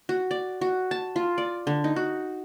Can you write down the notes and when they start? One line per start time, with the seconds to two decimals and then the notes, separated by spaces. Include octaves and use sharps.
0.09 F#4
0.31 D5
0.61 F#4
0.91 A5
1.16 F4
1.38 D5
1.67 D3
1.84 D#4
1.96 F#4